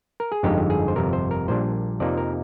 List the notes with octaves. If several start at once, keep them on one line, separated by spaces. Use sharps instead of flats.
A#4
G#4
G1 F2 D3 G#3 D#4 G4
G#4
C5
G1 F2 C3 A#4
C5
A#4
A#1 A#2 G3 D4 C5
F2 C3 F3 A#3 D#4 D5
A#4